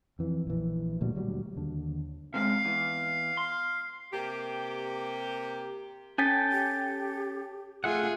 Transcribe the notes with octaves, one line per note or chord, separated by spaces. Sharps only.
F2 E3
A#1 E3
D2 A#2 F#3 G3
D2 A#2 F#3 G3
D#2 D3
C3 G#3 F5
E2
C6
C3 A#3 G4
C#4 A4 G5 G#5 A6 B6
G4
A3 F4 G#4 E5 F#5